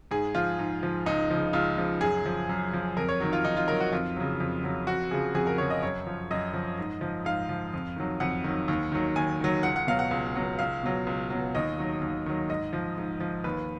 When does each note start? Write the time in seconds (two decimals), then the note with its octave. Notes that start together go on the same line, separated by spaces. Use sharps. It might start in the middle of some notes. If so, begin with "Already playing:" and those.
0.11 G#2 G#4
0.35 F3 F4
0.59 G#2
0.83 F3
1.06 C#2 D#4
1.31 C#3 F3
1.53 C#2 F4
1.77 C#3 F3
2.01 F#2 G#4
2.26 F3
2.49 F#2
2.73 F3
2.97 F2 A#4
3.09 C#5
3.20 D#3 F#3
3.33 F4
3.44 F2 D#4
3.57 F4
3.68 D#3 F#3 A#4
3.80 F#4
3.92 F2 F4
4.16 C#3 F#3
4.40 F2
4.64 C#3 F#3
4.87 F2 F#4
5.11 C#3 F3 G#4
5.35 F2 G#4
5.47 A#4
5.58 C#3 F3 C#5
5.70 D#5
5.83 F#2 C#5
6.07 F3
6.31 F#2 D#5
6.54 F3
6.78 G#2
7.01 F3
7.25 G#2 F5
7.49 F3
7.74 F2
7.96 D#3 F#3
8.20 F2 F#5
8.44 D#3 F#3
8.68 D#2
8.92 D#3 F#3
9.16 D#2 G#5
9.40 D#3 F#3
9.63 C#2 F#5
9.76 F#5
9.87 B2 F#3 F5
9.99 F#5
10.11 C#2
10.36 B2 F#3
10.59 C#2 F5
10.83 B2 F#3
11.07 C#2
11.30 B2 F#3
11.55 D#2 D#5
11.79 D#3 F#3
12.02 D#2
12.26 D#3 F#3
12.49 G#2 D#5
12.73 F3
12.98 G#2
13.20 F3
13.44 D#2 B4